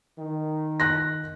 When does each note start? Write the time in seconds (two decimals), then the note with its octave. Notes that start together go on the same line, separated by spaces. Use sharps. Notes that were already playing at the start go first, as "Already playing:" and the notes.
0.19 D#3
0.80 F#6 A#6